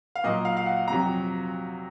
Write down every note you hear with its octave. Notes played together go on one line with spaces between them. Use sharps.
F5
A#2 F#3 A#3 D#5
F5
F5
F#5
F2 C3 F#3 A#5